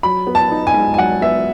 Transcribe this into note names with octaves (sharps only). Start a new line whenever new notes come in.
F#3 B5
B3
A5
D#4
G#5
G#2
G#5
F#3 F#5
B3 E5